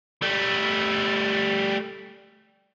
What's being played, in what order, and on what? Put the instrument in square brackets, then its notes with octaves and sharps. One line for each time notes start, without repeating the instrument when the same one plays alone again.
[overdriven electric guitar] G3 A3